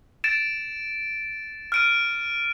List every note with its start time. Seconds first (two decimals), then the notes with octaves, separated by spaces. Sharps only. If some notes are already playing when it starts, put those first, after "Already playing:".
0.24 A6 D7 E7
1.72 F6 D7 D#7